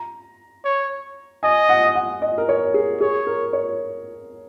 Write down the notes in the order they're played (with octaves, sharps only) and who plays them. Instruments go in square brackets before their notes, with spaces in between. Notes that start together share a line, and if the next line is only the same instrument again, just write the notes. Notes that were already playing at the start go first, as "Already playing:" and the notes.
Already playing: [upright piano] A#5
[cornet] C#5
[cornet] D#5 [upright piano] G#5
[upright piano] F#5
F#5
D#5
A#4
C#5
G#4
[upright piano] G#4 [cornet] C#5
[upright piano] A#4
C#5